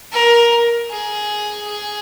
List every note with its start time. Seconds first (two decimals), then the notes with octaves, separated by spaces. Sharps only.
0.12 A#4
0.90 G#4
1.67 G#4